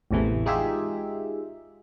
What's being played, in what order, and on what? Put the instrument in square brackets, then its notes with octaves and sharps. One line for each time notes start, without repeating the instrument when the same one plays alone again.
[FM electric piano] A1 E2 C3 E3 A3
G#3 D#4 F4 G4 G#4 E5